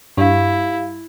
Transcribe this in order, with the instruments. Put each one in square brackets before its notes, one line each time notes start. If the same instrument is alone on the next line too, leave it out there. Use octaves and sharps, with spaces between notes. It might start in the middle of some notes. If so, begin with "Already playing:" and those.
[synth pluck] G2 [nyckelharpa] E4 [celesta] G4 F5